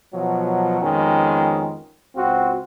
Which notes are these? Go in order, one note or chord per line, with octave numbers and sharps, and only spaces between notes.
B2 F3 F#3
F2 D#3 G#3 B3 C#4
C#2 C4 F4 F#4